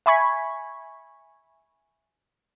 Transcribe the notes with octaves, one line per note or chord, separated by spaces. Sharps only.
E5 G#5 B5 C#6 G#6 B6